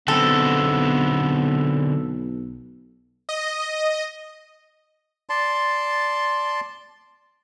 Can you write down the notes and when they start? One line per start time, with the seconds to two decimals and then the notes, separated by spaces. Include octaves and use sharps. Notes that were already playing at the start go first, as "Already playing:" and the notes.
0.08 B1 D3 B3 C4 A4
3.29 D#5
5.29 D5 A5 C6